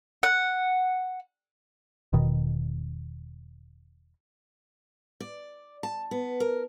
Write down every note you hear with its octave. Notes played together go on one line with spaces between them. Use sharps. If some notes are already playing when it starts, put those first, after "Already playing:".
F#5
E1 B2 D#3
D5
A5
B3
A#4